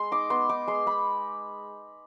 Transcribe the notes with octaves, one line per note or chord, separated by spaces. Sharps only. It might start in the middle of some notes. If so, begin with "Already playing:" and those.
Already playing: G#3 C6
D#4 D6
B3 C6
D#4 D6
G#3 C6
G#3 B5